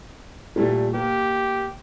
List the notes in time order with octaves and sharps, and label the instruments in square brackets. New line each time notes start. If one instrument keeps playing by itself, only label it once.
[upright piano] A#2 G3 A3
[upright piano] A#3 [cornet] G4